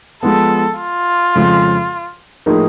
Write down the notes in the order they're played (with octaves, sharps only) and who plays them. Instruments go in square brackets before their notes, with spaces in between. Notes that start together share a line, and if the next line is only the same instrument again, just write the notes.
[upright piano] F3 G#3 B3 [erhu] A4
[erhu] F4
[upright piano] F2 C#3 F3 G#3
A2 F3 A#3 D#4 G#4